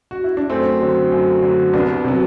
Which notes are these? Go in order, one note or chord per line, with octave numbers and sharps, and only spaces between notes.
F#4
E4
D4
F#2 A3 C4
D3 F#3
F#2
D3 F#3
C2 B3 D4
C3 F#3